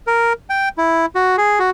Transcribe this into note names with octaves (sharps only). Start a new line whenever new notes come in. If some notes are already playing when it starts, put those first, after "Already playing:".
A#4
G5
E4
F#4
G#4
F#4